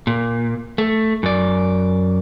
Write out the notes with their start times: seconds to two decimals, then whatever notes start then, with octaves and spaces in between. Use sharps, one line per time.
0.07 A#2
0.78 A3
1.23 F#2 D5